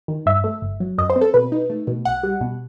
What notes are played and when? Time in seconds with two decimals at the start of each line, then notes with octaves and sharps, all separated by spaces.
0.08 D#3
0.26 G2 E5
0.44 A3
0.62 G1
0.80 F#3
0.98 F#2 D#5
1.10 C5
1.16 C4
1.21 A4
1.34 B2 B4
1.52 D#4
1.70 A3
1.87 B2
2.05 B1 F#5
2.23 G3
2.41 B2